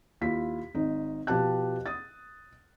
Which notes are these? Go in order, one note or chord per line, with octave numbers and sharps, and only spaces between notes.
D#2 E4 F4 B6
G#1 D#4
B2 F3 G4 G5 A5 F#6
D#6 A6